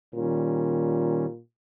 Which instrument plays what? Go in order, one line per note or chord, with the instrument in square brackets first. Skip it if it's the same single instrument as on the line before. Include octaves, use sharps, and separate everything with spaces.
[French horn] A#2 [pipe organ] D#3 G3 C#4